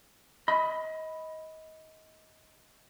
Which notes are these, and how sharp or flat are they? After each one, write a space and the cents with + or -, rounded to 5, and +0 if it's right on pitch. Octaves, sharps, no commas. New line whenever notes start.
D#5 +25 B5 +0